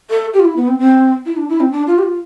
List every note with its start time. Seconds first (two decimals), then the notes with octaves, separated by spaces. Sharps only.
0.10 A4
0.34 G4
0.40 F4
0.45 E4
0.56 B3
0.68 C4
0.79 C4
1.26 E4
1.37 D4
1.49 E4
1.60 C4
1.72 D4
1.87 F4
1.98 G4
2.03 F4